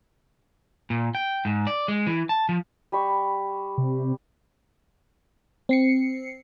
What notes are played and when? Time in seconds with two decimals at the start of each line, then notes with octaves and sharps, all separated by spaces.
0.90 A#2
1.15 G5
1.45 G#2
1.67 D5
1.88 G#3
2.07 E3
2.29 A5
2.49 F3
2.92 G3 B5 C#6
3.78 C3
5.69 C4 C7 C#7